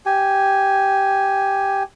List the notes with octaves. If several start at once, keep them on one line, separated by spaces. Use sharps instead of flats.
G4 G#5